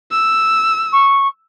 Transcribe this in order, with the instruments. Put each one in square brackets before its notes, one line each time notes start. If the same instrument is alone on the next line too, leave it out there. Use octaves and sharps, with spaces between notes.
[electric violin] E6
[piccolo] C#6